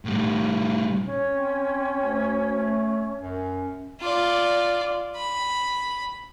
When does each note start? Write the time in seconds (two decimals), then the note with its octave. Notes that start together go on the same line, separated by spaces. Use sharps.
0.05 A2 G3
1.05 C#4
1.29 C4
2.03 D2
2.54 A3
3.18 F#2
4.00 F4 D5
5.16 B5